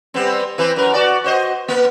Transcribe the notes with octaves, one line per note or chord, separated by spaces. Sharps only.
G3 B3 C4
E3 C4 B4
F#2 A#4 B4
F#4 D5
F#4 C5 D#5
A#3 B3